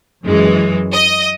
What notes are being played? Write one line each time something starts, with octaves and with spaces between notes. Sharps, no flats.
F#2 E3 G#3
D#5